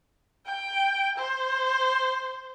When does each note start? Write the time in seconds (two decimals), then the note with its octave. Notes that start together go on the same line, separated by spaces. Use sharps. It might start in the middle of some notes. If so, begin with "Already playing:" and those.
0.46 G5
1.18 C5